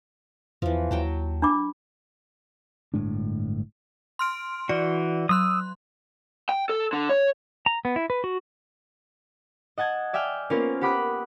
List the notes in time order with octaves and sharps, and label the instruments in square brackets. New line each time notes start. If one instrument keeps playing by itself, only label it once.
[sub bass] E2 [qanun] E3 F3
[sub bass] D#2 [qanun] F#3 G5 A5
[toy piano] D4 B5 D6
[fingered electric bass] G1 A2 G#3 D4
[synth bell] C6 F6 D7
[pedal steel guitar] E3 F#4 [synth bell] D5
[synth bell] F#3 C6 F#6 [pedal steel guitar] D#6 E6
[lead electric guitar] G5
A4
D3
C#5
[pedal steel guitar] A#5
B3
E4
B4
F#4
[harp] D#5 F#5 A5 G#6
D5 E5 G5 G#5 F6 G6
A#3 B3 C#4 F4 A#4 C5
G4 F#5 B5 D6 D#6 F#6